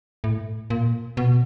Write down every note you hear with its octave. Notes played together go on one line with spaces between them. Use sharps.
A2
A#2
B2